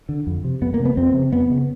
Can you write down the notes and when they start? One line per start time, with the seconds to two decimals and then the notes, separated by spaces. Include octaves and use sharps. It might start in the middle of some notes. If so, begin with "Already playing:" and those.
0.09 D3
0.27 F2
0.44 C3
0.62 F2 B3
0.74 A#3
0.80 C3
0.85 B3
0.97 F2 C4
1.14 C#3
1.32 F2 B3
1.50 C#3